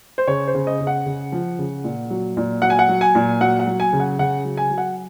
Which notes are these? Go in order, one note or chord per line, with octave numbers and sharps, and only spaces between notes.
C5
C#3 C#5
C5
C#3
D#5
C#3
F#5
C#3
F3
C#3
A#2
F#3
A#2
F#3 F#5
G#5
F#5
F#3
G#5
A#2
F#3 F#5
F#5
F#3
G#5
C#3
F#5
C#3 F#5
F#3
G#5
F#3
F#5